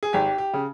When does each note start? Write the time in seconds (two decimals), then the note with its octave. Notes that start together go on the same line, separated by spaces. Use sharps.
0.03 G#4
0.13 G#1 G4
0.38 G4
0.54 C#3